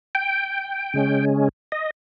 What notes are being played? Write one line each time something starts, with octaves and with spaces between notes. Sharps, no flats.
G5
C#3 G#3 C#4
D#5